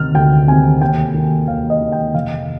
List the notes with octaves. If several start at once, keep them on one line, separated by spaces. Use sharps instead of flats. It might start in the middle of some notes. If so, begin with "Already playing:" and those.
Already playing: D2 C3 D#3 F6
D2 G5
C3 D#3 G#5
D#2 G5
D#3 A#3
D#2 F5
D#5
D#3 A#3
G5
F1 F5